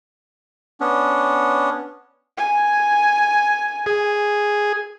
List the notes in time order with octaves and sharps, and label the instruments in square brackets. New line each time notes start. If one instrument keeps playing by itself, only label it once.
[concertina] B3 C#4 D4
[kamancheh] G#5
[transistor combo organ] G#4